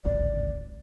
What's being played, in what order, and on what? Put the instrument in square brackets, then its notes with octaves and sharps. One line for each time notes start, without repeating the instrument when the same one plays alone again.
[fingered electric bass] D1 G#1 C#2 [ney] D5